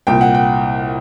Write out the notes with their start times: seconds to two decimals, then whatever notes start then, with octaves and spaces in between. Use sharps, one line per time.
0.07 C2 A#2 G5
0.21 F#5
0.35 G5